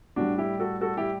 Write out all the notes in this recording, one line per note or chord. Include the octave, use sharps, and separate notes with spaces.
A2 G3 D4 F#4
E4 G4
F#4 A4
F#4 A4
E4 G4